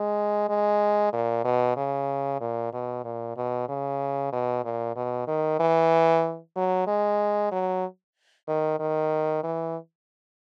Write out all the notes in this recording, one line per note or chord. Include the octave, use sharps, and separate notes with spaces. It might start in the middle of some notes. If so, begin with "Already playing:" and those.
Already playing: G#3
G#3
A#2
B2
C#3
A#2
B2
A#2
B2
C#3
B2
A#2
B2
D#3
E3
F#3
G#3
F#3
D#3
D#3
E3